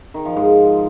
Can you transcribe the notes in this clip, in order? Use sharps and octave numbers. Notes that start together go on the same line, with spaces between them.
D#3
F3
G#2